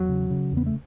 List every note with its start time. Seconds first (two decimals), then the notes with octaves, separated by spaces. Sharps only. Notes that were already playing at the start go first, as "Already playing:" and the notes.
Already playing: E2 F#3
0.09 C#3
0.30 C#3
0.52 E2
0.57 B3
0.66 A3